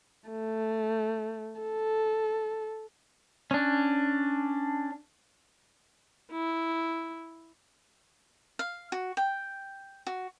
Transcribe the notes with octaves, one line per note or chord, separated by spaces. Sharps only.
A3
A4
C#4 D4
E4
F5
F#4
G5
F#4